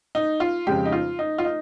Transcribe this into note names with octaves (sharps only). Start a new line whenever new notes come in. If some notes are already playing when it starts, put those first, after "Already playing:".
D#4
F4
F2 C#3 G#3 G4
D#4
F4
D#4
F4
D#4